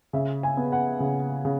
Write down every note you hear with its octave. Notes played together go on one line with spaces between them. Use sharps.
C#3 E5
G#5
B3
F#5
C#3
C#3